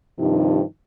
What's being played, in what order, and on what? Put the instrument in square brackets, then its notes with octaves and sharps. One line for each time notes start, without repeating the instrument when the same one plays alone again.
[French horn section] G2 C3 D#3 F3 D#4